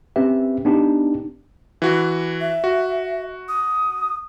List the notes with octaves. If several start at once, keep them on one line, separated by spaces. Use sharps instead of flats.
C4 C#4 G4 B4 E5
B3 D4 D#4 G4
E3 F#4
E5
F#4
D#6